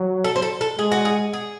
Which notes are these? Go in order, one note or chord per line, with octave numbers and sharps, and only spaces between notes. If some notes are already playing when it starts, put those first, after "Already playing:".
Already playing: F#3
A4
C5
A4
A4
G#3 G#4
F#4
G#4
G#4